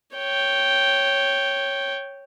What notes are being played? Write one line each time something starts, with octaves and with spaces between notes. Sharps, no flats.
C#5 G5